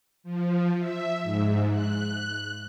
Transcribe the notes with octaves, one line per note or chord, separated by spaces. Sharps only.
F3
E5
G#2
F#6